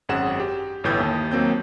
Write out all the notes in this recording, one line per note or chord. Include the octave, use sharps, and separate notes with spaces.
G#1 F#2 G#4 F#5 E7
G4
G1 A2 E3 G6
D#2 A5
D#2 F#3 A#3 C4 G6